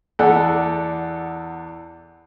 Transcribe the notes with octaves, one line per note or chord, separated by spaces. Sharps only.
E2 A4 D5 F#5